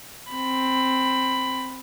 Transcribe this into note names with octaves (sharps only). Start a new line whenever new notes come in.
C4 B5